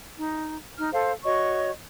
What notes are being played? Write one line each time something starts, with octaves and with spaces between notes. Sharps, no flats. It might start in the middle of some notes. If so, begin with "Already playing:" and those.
D#4
D#4 F6
A4 C5 F5
F#4 C#5 D#5 C#6